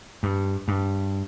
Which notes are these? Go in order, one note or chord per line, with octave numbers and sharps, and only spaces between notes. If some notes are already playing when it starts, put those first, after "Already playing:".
G2
G2